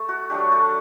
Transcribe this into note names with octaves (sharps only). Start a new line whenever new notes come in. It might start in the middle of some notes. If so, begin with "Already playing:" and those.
Already playing: A3 A4
F#4
F#3 A3 D4 G4
A3 A4